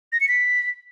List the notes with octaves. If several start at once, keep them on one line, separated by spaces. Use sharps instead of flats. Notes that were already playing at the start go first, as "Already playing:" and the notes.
A#6
C#7
B6